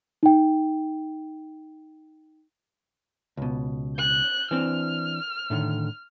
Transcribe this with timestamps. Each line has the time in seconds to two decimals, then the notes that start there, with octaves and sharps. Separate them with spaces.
0.23 D#4 G5
3.37 C#2 B2
3.98 F#6 G6
4.51 E3 C4 D4 F6
5.50 A2 D3 D#3